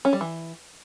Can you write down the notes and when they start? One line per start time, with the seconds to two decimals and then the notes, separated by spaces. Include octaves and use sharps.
0.05 C#4
0.13 G3
0.21 E3